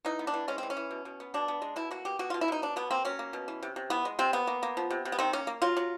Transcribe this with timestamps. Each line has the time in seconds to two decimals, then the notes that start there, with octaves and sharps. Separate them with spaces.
0.05 E3 D#4
0.19 B3
0.27 D4
0.34 E3
0.48 G#3 C#4
0.58 E3 C4
0.70 C#4
0.77 E3
0.91 B2
1.05 B2
1.20 B3
1.34 B2 D4
1.48 B3
1.62 G#3
1.76 B2 E4
1.91 A#3 F#4
2.05 B2 G4
2.19 B2 F#4
2.30 B2 F4
2.41 E4
2.48 B2 D#4
2.62 F#3 D4
2.76 B2 B3
2.91 A#3 C4
3.05 F#3 C#4
3.19 A#3
3.33 B2
3.48 E3
3.63 C3
3.76 C3
3.90 E3 B3
4.05 G#3
4.19 C3 C4
4.33 A#3 B3
4.47 A#3
4.63 A#3
4.77 F3
4.90 C3
5.05 C3
5.12 B3
5.19 D#3 C4
5.33 A#3 C#4
5.47 A#3
5.62 F#3 F4
5.77 F#3